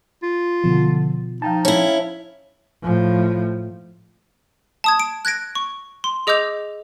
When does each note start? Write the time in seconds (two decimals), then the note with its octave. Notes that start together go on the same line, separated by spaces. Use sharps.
0.23 F4
0.64 B2 D3 F3
1.42 F3 D#4 F5 G5 A5
1.65 C#4 E4
2.83 A2 F3
4.84 A5 D#6 G#6
5.00 D7
5.25 F#6 G#6 A#6 D7
5.55 C#6
6.04 C6
6.27 G#4 D#5 D6 E6 G6 F7